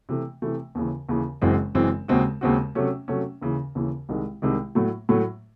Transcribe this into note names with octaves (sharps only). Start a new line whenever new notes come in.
C3 E3 A3
C3 E3 A3
D#2 C#3 E3
D#2 C#3 E3
F#1 F#2 E3 G#3 C4
F#1 F#2 E3 G#3 C4
D#2 C#3 G#3 C4 F#4
D#2 C#3 G#3 C4 F#4
C3 F#3 A3 C#4
C3 F#3 A3 C#4
D#2 C#3 E3
D#2 C#3 E3
C2 C3 D#3 G#3
C2 C3 D#3 G#3
A2 F#3 A3
A2 F#3 A3